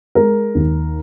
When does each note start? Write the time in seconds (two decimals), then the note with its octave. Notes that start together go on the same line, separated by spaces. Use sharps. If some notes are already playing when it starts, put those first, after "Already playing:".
0.15 G#3 A#4
0.55 D#2